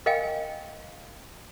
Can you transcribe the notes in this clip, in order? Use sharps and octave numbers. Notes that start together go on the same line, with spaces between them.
A#4 D#5 F5 G5 G#5